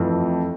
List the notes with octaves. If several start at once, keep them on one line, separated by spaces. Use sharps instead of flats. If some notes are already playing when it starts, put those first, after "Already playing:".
Already playing: F2 E3 A3 C4